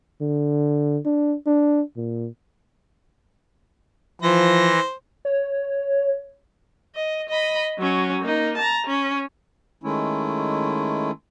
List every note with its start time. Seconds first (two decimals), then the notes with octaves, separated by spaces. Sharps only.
0.21 D3
1.06 D4
1.46 D4
1.96 A#2
4.22 E3 F3 C5 A#6
5.25 C#5
6.95 D#5
7.29 D#5 B5
7.78 F#3 C#4
8.22 A#3 D#4
8.57 A5 A#5
8.87 C#4
9.83 D#3 G#3 A3 C#4 E4